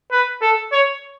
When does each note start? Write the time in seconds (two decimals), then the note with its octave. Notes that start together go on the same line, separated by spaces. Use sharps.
0.12 B4
0.42 A4
0.72 C#5